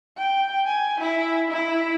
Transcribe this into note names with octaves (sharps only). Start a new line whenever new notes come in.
G5
G#5
E4
E4